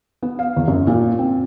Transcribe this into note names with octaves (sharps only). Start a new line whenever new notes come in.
B3
F5
E2
F#2
A#2
C4